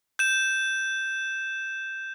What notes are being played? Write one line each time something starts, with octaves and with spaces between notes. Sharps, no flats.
G6 E7